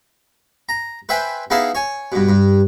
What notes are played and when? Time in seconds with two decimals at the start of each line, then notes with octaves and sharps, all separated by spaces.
0.69 A#5
1.09 B4 C5 E5 G5 G#5
1.50 B3 D#4 E4 G#4 F5 A5
1.75 C#5 G#5
2.12 G2 B2
2.29 G2